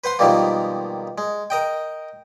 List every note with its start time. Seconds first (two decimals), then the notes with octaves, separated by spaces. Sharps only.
0.04 B4 C5 F#5 C6
0.19 G#2 B2 D#3 F3 G3 A#3
1.18 G#3
1.50 A#4 D#5 G5